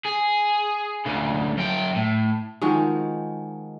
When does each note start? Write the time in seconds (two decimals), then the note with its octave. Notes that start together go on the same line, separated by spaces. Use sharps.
0.05 G#4
1.06 D2 C#3
1.58 F#2 G5
1.96 A2
2.62 D#3 F3 G#3 F#4